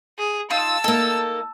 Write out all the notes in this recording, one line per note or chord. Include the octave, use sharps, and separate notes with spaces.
G#4
D#4 F4 A5 E6
A#3 D#4 A4